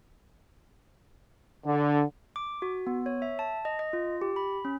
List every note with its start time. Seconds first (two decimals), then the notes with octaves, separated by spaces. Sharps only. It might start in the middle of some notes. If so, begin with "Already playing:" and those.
1.66 D3
2.36 D6
2.62 F#4
2.87 B3
3.06 C#5
3.22 E5
3.39 A5
3.65 D#5
3.79 D#5
3.93 F4
4.21 G4
4.36 B5
4.65 C#4